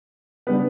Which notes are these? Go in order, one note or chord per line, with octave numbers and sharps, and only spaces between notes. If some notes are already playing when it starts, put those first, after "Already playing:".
C#3 G3 B3 D4 B4